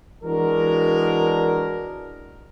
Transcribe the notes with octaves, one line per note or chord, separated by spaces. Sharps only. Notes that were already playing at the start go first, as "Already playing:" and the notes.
E3 G#3 D4 F#4 A#4